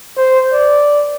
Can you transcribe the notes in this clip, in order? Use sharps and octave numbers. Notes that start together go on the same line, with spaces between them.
C5
D5